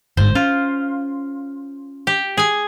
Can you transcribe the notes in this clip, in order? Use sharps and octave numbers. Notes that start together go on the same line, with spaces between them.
G1 G#2 C5
C#4 F4
G4
G#4 G#5